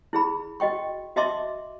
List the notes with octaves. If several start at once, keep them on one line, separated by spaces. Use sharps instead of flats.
E4 G#4 B5
F#4 D#5 G5 C#6
F#4 D#5 E5 A5 C6 D6